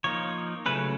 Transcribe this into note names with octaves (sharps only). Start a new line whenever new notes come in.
F3 A#3 D#4 C#5
C#3 F#3 A3 C#4 B4